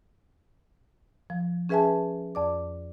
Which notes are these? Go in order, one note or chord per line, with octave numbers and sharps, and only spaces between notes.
F3
C#4 G#4 B4 E5 G#5 A5
F2 D5 D6